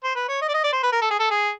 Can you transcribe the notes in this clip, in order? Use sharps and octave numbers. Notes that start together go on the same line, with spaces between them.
C5
B4
C#5
D#5
D5
D#5
D5
C5
B4
A#4
A4
G#4
A4
G#4